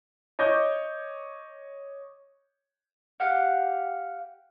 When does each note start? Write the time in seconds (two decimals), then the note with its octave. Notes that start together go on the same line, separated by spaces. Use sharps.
0.39 C#5 D#5 D6 G6
3.20 G4 F5 F#5